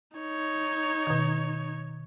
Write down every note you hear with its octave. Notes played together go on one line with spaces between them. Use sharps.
D#4 C#5
B2 D#3